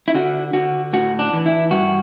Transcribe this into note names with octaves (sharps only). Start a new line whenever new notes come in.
E4
D3 F#4
D3 F#4
A2 F#4
D4
E3
E4
G2 F#4